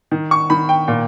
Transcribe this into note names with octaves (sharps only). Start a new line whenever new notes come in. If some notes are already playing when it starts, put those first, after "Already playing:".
D#3
C#6
D#3 B5
G5
A#2